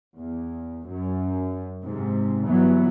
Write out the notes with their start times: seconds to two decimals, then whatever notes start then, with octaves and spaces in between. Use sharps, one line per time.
0.17 E2
0.87 F#2
1.83 G#2 C3
2.46 G1 E3 F#3 B3